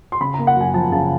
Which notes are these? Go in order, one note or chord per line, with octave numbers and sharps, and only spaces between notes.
C6
C#3 B5
A#3 A#5
F#5
F#2 G#5
F3 A5
C#3 A5